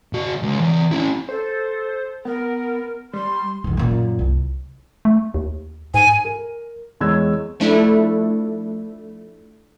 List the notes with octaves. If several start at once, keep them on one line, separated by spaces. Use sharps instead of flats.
C#3 F#4
C#2
E3 D5
C#4 E4
A4 C5
B3 A#4
G3 C6
B1 E2
F#2 A#2
C2
A3
D#2
G#2 G#5
A#4
E2 G#3 C#5 E6 G#6
F3 A3 D4 E4 A4